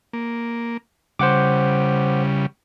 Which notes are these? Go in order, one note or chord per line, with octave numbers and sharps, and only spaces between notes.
A#3
C#3 G3 C5 F#5 D6